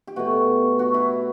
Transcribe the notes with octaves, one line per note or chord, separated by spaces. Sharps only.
G4
B2 A3 F#4
F#4
E4